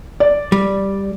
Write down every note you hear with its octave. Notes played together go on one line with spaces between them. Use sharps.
D5
G3